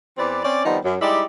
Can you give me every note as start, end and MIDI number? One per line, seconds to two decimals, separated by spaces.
0.18 0.41 40
0.18 0.41 52
0.18 0.41 60
0.18 0.41 71
0.18 0.41 74
0.44 0.65 60
0.44 0.65 61
0.44 0.65 74
0.65 0.78 51
0.65 0.78 53
0.65 0.78 55
0.65 0.78 59
0.65 0.78 60
0.65 0.78 63
0.84 0.96 42
1.00 1.23 55
1.00 1.23 56
1.00 1.23 63
1.00 1.23 64
1.00 1.23 67
1.00 1.23 74